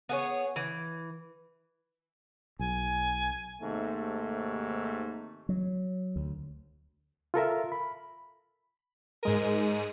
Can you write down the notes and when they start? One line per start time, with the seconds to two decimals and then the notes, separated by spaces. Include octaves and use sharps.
0.09 B3 G#4 C#5
0.56 E3
2.59 B1 G#5
3.62 D#2 G#2 C3 A3
5.49 F#3
6.16 D2
7.34 F4 A4 A#4 E5
7.72 B5
9.23 G#2 G#3 A#4 D#7